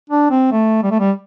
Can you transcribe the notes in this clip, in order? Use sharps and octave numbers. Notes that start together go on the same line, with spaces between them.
D4
C4
A3
G3
A3
G3